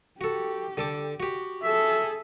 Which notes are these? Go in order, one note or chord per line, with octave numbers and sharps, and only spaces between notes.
F#4 G4 A4
D3 A4 D6
F#4 G4
G#4 A4 E5